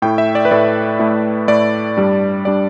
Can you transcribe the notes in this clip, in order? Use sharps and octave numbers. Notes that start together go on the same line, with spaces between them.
A2 A3 E4 G5
E5
D5
B4
A2 A3 E4 D5
A2 A3 E4
A2 A3 E4 D5
G2 G3 D4
G3 D4 D5